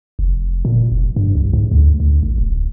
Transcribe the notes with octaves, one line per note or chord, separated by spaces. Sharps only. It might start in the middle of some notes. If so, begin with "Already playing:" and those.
F1
A#2
F1
G2
C2
G#2
D2
D2
A1
D1